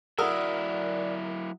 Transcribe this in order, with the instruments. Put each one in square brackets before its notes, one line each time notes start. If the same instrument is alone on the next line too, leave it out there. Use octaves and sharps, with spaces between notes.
[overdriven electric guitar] F#3 E4 [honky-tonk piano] A#4 [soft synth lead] D5 [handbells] F#5 D#6 E6